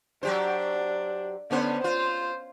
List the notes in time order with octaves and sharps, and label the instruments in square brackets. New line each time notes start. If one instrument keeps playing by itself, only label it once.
[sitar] F#3 G4 C5 [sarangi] D4
[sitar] D3 C#4 C5 [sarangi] B3
[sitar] F4 [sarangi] C5